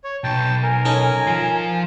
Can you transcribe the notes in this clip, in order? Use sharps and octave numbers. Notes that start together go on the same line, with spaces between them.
C#5
B1 G5 A5
A#4 G#5
C#4 D#4 A4
F3 F4